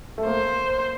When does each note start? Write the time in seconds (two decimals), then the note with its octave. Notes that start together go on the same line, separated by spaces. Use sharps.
0.18 A3
0.26 A#3 C5